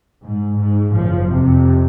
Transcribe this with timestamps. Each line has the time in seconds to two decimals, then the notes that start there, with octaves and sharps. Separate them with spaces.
0.24 G#2
0.55 G#2
0.89 F#1 F3
1.27 F2 C3